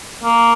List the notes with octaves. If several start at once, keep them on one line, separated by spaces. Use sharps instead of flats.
A#3